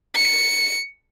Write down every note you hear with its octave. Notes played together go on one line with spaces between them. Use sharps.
C#7